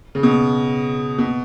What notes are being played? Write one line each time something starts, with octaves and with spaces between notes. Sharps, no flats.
C#3
B2
B2